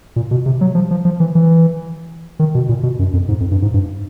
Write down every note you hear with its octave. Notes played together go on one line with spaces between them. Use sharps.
A#2
B2
C3
F#3
F3
F3
F3
E3
E3
D#3
B2
A#2
B2
F#2
F2
G#2
F2
G2
G#2
G2